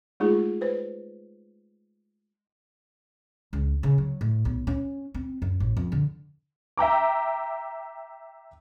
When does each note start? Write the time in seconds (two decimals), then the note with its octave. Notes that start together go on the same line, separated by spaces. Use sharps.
0.20 G#3 A3 D#4 F4 G#4
0.61 B4 C5
3.53 C#2
3.83 C#3
3.98 F#3
4.21 A2
4.45 B1
4.67 C#4
5.14 C4
5.42 F#2
5.60 A1
5.77 F2
5.92 D3
6.77 E5 G5 A#5 D6